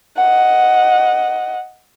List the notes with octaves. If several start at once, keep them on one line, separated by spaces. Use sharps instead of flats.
D#5 F#5